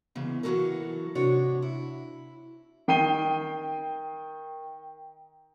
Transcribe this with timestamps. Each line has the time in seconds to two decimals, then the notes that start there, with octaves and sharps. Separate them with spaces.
0.15 E2 G#2 C#3
0.43 E3 F#3 G3 F#4 A4 A#4
1.15 G#2 C3 D4 F#4 C#5
1.62 E4
2.88 D#3 G5 C7 D#7 G7